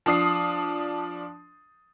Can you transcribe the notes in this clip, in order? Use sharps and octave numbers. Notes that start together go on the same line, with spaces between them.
F3 D4 D#6 C7